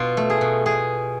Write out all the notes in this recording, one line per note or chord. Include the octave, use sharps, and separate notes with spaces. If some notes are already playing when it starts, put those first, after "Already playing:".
Already playing: B2 F4
A3
G#4
B2
B2 G#4